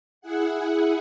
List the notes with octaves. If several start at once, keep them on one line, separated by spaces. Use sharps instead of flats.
E4 G#4 F#5